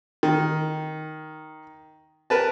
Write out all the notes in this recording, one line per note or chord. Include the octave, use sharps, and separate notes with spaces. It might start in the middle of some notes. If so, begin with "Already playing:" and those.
D#3
A#4 B4 A5